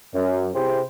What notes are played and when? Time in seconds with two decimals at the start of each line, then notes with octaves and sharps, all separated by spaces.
0.13 F#2
0.54 C3 E4 G4 G#4 C5